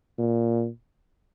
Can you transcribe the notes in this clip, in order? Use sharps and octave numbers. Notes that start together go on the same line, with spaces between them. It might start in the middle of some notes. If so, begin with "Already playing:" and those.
A#2